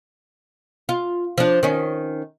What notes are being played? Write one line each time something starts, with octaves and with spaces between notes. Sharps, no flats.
F4
F3 D4
D#3 C#4